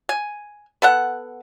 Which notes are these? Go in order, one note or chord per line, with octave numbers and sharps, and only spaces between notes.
G#5
B3 A4 F#5